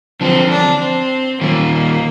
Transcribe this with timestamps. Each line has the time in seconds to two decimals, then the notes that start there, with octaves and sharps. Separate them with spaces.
0.21 D3 F3 C4
0.50 D4
0.81 C4
1.41 D#3 G3 A#3